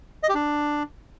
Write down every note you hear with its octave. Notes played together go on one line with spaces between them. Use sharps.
D#5
G4
D4